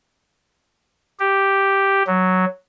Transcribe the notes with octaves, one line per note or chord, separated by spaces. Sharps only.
G4
F#3